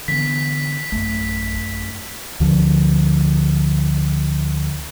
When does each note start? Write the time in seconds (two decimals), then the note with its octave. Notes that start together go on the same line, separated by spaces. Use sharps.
0.08 D3 E3 B3 B6
0.92 A1 F#2 A3
2.40 D2 D3 F3